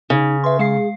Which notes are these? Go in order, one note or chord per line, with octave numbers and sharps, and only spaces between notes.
C#3 D#4
B4 E5 C6
G#3 G#4 F5 C7